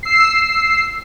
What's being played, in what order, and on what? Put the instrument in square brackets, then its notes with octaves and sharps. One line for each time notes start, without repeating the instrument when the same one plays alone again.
[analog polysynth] E6 C7